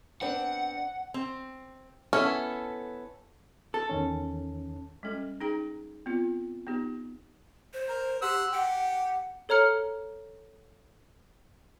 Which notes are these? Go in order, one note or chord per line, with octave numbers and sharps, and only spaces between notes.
B3 C4 D4 F#5
C4
B3 C#4 E4 A4
A4
E2 D#3 C#4
G3 G#3 C#4 A4
D#4 G#4 G5 A#5
B3 C4 F4
B3 D#4 G4
C5
A#4
G4 F#5 C6 E6
G4 F#5
A4 C#5 A#5 F6 C#7